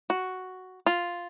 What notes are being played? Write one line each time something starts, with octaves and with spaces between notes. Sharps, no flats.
F#4
F4